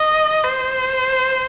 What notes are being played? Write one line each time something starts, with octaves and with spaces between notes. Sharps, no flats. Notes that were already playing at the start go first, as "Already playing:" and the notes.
Already playing: D#5
C5